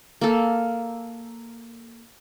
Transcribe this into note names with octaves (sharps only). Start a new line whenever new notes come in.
A#3 A4